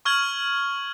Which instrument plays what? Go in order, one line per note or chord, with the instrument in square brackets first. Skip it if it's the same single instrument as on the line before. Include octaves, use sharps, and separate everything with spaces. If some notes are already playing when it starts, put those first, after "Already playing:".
[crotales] C#6 F6 G#6 F#7